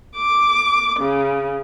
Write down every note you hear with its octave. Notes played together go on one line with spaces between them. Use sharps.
D6
C#3